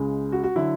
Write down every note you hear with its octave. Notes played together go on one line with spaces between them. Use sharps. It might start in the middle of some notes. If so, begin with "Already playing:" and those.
Already playing: C#2 C#3 G#3
F#4
F#4
D3 F#3 E4